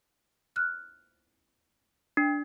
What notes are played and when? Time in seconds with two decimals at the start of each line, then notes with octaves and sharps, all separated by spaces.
0.56 F6 F#6
2.17 D4